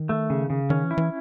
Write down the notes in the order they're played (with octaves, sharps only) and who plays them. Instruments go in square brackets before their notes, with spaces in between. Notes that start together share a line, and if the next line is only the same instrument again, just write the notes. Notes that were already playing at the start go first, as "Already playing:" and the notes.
Already playing: [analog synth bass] D#3
[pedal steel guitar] A3
C#3
C#3
[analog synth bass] D#3 [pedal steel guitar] C#4
[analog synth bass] E3
[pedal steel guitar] E4
[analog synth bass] E3